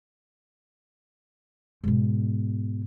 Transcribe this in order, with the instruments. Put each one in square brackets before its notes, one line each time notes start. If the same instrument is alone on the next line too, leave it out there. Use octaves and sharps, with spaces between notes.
[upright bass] G#2 B2